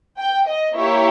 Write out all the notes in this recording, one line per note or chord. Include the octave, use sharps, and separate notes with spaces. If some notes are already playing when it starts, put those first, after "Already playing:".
G5
D#5
A#3 E4 G4 C#5